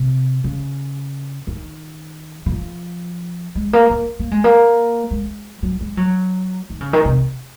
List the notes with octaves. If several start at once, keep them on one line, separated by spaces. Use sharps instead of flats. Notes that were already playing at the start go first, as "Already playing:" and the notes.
Already playing: C3
C#3
D#3
D#3
F3
G#3
A#3
A#3
A#3
G#3
A#3
G#3
F#3
G#3
F#3
D#3
C#3
D#3
C3